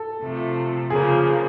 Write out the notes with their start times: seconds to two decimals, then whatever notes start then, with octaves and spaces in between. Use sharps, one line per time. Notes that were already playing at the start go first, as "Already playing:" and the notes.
Already playing: A4
0.23 C3 F3 A3
0.90 C#3 F3 A#3 G#4